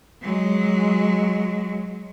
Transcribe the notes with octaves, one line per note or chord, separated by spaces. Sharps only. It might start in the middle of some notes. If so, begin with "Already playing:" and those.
F#3 G#3